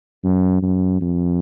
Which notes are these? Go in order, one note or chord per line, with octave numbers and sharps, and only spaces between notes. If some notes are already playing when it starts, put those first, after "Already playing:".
F#2
F#2
F2